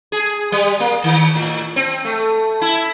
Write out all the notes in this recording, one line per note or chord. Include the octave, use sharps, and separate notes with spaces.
G#4
G3
A#3
D#3
A2
C4
A3
E4